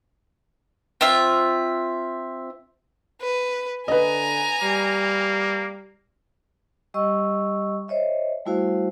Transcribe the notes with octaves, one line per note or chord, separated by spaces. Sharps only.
C4 F4 E5
B4
D3 B4 D#5 G#5 A#5
G3 A#3
G3 G4 D#5 C#6 E6
C5 C#5 D#5 E5
G3 A3 E4 F#4 C5 F5